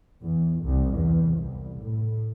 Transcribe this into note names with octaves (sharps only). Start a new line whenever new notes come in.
E2
C2
E2
C2
A2